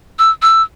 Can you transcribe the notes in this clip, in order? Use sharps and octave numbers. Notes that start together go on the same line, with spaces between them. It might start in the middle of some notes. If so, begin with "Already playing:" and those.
E6
E6